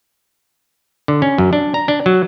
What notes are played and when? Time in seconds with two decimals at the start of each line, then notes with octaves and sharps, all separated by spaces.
1.08 D3
1.22 C#4
1.38 F#2
1.53 D4
1.74 A#5
1.88 D4
2.06 F#3